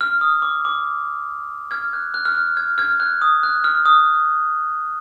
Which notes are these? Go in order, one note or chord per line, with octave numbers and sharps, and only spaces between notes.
F6
D#6
D6
D6
F6 G#6
F#6
F#6
F6
F#6
F6 G#6
F6 G#6
F#6
D#6
F#6
F6
D#6